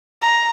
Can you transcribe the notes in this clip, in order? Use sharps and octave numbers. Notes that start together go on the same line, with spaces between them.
A#5